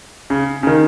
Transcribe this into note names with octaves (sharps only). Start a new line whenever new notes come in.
C#3
C#3
D#3